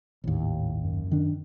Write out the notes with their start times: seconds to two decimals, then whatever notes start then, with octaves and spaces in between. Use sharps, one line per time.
0.24 G#1 D#2 A2
0.82 F#2
1.11 D#3 D4